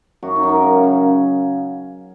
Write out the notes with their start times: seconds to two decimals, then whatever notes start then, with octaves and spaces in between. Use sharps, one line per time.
0.23 F#2 F#4
0.36 D#4
0.43 F#2
0.49 A#4
0.63 C#3
0.84 C#3